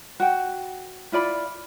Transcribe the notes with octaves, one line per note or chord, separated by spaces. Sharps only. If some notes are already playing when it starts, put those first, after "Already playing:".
F#4 G5
E4 F4 D5 B5